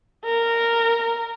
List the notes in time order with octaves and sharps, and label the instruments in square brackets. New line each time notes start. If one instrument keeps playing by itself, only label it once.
[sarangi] A#4